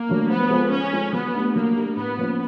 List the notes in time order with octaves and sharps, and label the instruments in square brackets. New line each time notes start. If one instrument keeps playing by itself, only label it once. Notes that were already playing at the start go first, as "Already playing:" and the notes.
Already playing: [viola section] A#3
[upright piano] F#3 A3 D4
[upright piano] F3 [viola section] B3
[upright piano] G#3 C4 F4 A4
[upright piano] F3 [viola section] C#4
[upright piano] G#3 C4 F4 A4
[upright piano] F#3 [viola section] B3
[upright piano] A3 D4 G4
[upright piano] F#3 [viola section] A#3
[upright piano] A3 D4 G4
[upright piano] A2 [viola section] B3
[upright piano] F3 A#3 C#4 F4